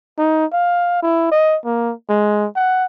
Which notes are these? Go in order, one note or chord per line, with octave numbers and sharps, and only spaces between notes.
D#4
F5
E4
D#5
A#3
G#3
F#5